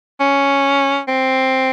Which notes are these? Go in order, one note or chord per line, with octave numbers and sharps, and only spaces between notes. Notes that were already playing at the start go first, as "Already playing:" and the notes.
C#4
C4